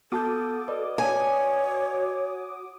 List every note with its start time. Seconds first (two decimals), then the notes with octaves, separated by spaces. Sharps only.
0.12 B3 F#4 A4 A5 D6 D#6 G6
0.68 B4 D5 D#5
0.98 C#5 G#5